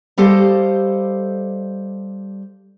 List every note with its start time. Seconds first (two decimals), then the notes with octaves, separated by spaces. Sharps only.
0.17 G3 G4 A4 C5 D#5 F5